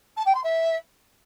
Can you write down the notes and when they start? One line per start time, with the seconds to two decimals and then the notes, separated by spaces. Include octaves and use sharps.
0.17 A5
0.26 G5
0.35 C6
0.44 E5